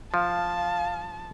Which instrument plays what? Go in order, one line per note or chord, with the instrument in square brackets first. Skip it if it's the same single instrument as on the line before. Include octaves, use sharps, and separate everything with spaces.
[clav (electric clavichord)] F3 [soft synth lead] F5 [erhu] A5